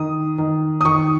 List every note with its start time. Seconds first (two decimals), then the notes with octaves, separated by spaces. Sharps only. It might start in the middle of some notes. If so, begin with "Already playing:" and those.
Already playing: D#3 D#6
0.38 D#3
0.81 D#6
0.85 D#3 C#6